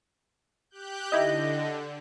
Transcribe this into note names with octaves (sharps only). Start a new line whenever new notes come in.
G4 F#6 G6
D3 D#4 E4 G4 D#5